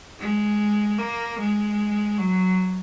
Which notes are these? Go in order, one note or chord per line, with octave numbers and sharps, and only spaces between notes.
G#3
A#3
G#3
F#3